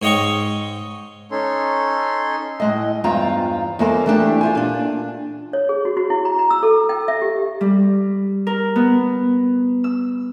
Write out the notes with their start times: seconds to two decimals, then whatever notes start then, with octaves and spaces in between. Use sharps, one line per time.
0.02 G#2 C#5 D#5 G5 C#6
1.31 C#4 D#4 A4 C#5 C6
2.60 A2 G#3 D#5
3.04 E2 G2 C4 F4 A#5
3.79 E2 G#3 A#3 A4 A#4 C5
4.06 E3 A3 D4 G4
4.41 F4 C5 G#5
4.55 A#2 D4
5.53 C#5
5.69 G#4
5.85 F#4
5.97 F#4
6.10 E4
6.25 A#5
6.39 A#5
6.50 E6
6.63 A4
6.89 G5
7.08 E5
7.22 G4
7.61 G3
8.47 A#4
8.76 B3
9.84 E6